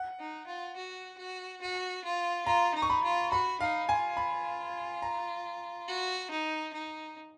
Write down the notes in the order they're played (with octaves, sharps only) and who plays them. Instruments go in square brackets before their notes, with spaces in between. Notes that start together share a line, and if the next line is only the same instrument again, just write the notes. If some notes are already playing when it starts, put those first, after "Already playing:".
Already playing: [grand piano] F#5
[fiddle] D#4
F4
F#4
F#4
F#4
F4
[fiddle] F4 [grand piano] A#5
[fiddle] D#4
[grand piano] C#6
B5
[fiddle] F4
[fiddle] F#4 [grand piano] B5
[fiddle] D#4 [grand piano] F5
[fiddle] F4 [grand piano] G#5
[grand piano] B5
A#5
[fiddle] F#4
D#4
D#4